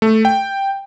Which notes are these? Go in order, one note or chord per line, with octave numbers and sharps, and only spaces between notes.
A3
G5